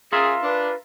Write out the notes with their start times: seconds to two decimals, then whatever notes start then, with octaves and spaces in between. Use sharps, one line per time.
0.13 C#4 F4 G#4 A#4 E5
0.43 D4 B4